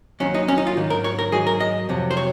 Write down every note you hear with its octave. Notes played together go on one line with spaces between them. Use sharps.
D#2 D#3 F#3 C#4
D#4
C#4
D#4
F4
G#2 D#3 F#3
A#4
C#5
A#4
G#2 F#3 G#4
A#4
D#5
F2 C3 F#3
C5
C#5